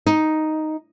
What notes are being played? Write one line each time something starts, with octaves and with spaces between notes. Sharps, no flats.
D#4